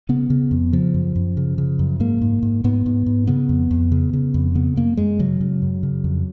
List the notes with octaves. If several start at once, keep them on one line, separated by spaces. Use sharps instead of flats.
C#3 B3
C#3
F2
C#3 F3
F#2
F#2
C#3
C#3
F#2
G#2 A#3
G#2
G#2
G#2 B3
G#2
G#2
C#3 B3
F2
F2
C#3
C#3
F2
C#3 B3
F#2 A#3
F#2 G#3
C#3 F#3
C#3
F#2
C#3
F2